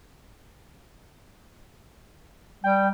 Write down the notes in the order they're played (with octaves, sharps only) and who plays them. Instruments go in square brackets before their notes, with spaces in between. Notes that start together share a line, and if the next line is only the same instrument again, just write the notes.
[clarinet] G3 [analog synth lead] G5